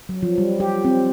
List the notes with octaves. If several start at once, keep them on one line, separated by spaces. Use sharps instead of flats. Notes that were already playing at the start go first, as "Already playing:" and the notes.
F#3
F3
G3
G4
C4